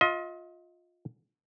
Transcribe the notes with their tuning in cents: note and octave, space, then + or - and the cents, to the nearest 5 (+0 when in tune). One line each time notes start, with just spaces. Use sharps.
F4 +20 D#5 +35